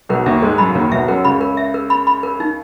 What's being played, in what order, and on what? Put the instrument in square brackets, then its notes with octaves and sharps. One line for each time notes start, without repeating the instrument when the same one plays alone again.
[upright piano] B1 B2 [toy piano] A#4
[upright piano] D#2 D#3 [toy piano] E5
[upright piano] G#2 G#3 [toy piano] A#4
[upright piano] F#2 F#3 [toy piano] B5
[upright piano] C#3
[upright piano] D#2 D#3 [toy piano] A#4
[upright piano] B1 B2 [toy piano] E5
[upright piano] F#2 [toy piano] A#4
[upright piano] C#2 C#3 [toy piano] B5
[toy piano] A#4
E5
A#4
B5
B5
A#4
D#4